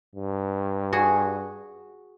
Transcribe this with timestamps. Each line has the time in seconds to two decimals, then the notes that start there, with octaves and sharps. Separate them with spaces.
0.15 G2
0.93 F#4 G#4